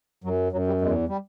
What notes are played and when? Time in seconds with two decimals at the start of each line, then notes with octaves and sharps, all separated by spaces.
0.24 F#2 F#3
0.52 F#2 F#3
0.67 G3
0.81 E2 G#3
1.09 G3